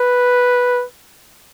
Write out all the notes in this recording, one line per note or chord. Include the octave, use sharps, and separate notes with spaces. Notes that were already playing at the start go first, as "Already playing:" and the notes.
Already playing: B4